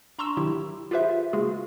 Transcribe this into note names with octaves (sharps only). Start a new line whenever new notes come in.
D4 A#5 C6 C#6 E6 E7
D#3 F#3 E4 G4
F4 G4 G#4 B4 C5 E5
C#3 G#3 A#3 F4 F#4 G#4